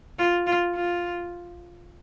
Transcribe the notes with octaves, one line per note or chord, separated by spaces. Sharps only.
F4
F4
F4